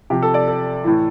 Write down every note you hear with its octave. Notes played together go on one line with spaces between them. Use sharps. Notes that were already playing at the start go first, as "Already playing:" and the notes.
C3 F3 G4
A4
D5
A4
A2 E3